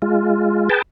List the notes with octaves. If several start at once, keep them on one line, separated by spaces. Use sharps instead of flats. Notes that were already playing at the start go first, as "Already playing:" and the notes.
G#3 F4
G#4 B4 G5 A5